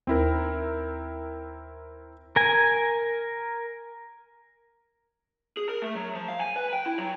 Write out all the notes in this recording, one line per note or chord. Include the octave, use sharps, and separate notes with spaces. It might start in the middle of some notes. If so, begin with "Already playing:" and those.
D#2 C4 E4 A#4
A#4 G#5
G#4
A#4
A3
F#3
F3
F5
G#5
B4
G5
E4
F#3